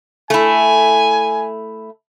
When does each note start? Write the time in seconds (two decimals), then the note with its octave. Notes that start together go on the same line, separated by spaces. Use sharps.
0.30 A3 E4 G#5